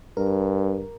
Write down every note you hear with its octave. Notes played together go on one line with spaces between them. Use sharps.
G2 A#4